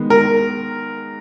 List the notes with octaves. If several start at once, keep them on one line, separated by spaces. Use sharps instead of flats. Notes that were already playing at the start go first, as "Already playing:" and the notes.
Already playing: D#3 G#3 B3
A#4